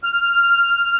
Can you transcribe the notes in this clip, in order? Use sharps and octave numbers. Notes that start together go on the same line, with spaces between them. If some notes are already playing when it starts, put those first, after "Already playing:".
F6